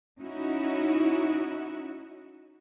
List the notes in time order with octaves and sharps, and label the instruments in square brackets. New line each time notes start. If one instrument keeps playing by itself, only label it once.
[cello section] C#4 D#4 E4 F#4